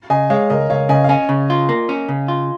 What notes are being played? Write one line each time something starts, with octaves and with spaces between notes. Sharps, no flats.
C#3 D#5 G#5
G#3 C#5 F5
C#2 A#4 D#5
C#2 C#5 F5
C#3 D#5 G#5
F5
C#4 D#5 G#5
C#3
F4
A#3
C#4
C#3
F4